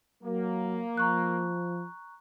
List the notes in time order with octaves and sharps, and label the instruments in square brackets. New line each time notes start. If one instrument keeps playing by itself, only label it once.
[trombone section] F#3 [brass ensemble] A#3
[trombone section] F3 [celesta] A#5 C#6 F#6